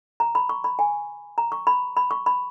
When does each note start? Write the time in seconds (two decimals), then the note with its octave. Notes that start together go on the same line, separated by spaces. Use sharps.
0.20 A#5
0.35 B5
0.49 C#6
0.64 B5
0.79 G#5
1.38 A#5
1.52 C#6
1.67 B5
1.97 B5
2.11 C#6
2.26 B5